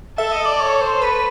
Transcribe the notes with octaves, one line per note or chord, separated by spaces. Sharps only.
A4 E5
D#5
D5
C#5
C5
B4